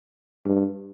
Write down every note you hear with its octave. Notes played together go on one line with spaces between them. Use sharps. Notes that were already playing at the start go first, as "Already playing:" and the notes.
G2